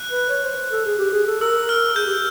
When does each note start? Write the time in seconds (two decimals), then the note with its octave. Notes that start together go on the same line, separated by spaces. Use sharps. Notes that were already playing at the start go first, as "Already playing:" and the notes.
Already playing: F#6
0.11 B4
0.29 C#5
0.44 C5
0.71 A4
0.86 G#4
0.99 G4
1.13 G#4
1.27 A4
1.41 A#4 E6
1.69 F6
1.96 G#4 G6
2.06 G4